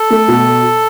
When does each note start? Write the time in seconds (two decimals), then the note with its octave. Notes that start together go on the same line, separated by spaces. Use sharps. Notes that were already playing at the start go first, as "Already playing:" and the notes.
Already playing: A4
0.10 A3
0.28 B2